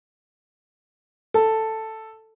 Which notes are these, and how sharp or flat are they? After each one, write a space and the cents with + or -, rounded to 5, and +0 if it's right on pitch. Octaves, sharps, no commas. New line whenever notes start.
A4 +5